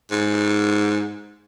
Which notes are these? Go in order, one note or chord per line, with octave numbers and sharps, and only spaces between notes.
G#2